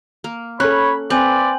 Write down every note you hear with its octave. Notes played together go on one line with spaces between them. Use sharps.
A#3
C#4 A4 C#5 B5 F#6
C4 B4 D5 G#5 C6 G6 F#7